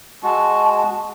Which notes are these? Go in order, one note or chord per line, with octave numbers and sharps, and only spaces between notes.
G#3 F#4 A5